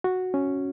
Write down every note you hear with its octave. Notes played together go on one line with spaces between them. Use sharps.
F#4
C#4